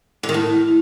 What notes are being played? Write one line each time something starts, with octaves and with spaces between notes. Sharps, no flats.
D3
D#3
A2